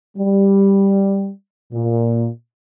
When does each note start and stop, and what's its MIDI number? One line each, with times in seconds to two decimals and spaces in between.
0.18 1.30 55
1.73 2.28 46